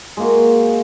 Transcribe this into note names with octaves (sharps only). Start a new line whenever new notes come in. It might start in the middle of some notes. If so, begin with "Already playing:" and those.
G#3 A#3 F#4